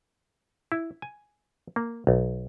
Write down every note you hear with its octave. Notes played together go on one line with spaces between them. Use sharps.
E4
G#5
A#3
B1